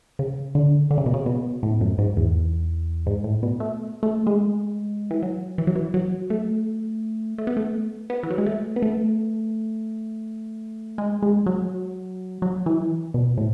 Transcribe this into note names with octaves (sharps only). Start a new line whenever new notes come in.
C#3
D3
D3
C#3
B2
C#3
B2
A2
F#2
G#2
E2
G#2
A2
B2
A3
A3
G#3
E3
F#3
E3
F#3
E3
F#3
A3
A3
B3
A3
B3
E3
F#3
G#3
A3
B3
A3
G#3
G#3
F#3
F#3
E3
B2
A2